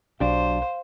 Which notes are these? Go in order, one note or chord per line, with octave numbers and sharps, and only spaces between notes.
B1 F#3 D4 G4 C5 F5